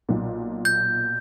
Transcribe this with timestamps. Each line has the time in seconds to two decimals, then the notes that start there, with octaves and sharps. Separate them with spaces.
0.09 B1 A#2
0.65 G6